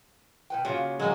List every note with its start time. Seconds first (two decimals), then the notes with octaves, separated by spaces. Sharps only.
0.50 B2 B4 G5
0.65 C#3 A#3 F4 F#4
1.00 D3 F#3 G#3 A#3